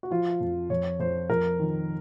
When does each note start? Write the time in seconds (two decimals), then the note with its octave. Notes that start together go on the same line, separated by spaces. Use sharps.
0.03 F#4
0.11 F3 F4
0.40 F2
0.70 F2 C#5
1.00 F2 C5
1.30 F2 A#4
1.59 D#3